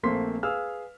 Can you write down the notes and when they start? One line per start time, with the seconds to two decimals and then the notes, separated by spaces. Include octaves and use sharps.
0.03 A#1 A3 A#3 C4 C6 B6
0.43 G#4 B4 F5 E6 F6